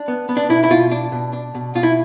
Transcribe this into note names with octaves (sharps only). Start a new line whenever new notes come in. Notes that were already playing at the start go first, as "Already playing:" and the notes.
Already playing: D4
B3
B3
D4
B2 E4
E4
B2 F4
D4
B2
D4
B2
B2 F4
E4